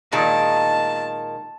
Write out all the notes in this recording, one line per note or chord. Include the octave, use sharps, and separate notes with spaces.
A#2 D#3 G#3 A5